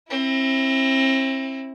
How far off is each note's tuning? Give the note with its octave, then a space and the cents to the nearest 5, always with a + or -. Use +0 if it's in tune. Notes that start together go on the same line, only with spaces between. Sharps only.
C4 +35 E4 +0